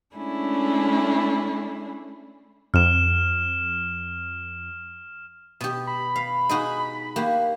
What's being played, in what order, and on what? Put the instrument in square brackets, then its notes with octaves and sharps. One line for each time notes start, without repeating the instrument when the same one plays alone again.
[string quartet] G#3 A3 C#4 D4 E4 G#4
[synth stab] F2 [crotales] F6 E7
[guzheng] B2 G4
[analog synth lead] B5
[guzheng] F5
G#3 D#4 F#4
A#3 F#4 G4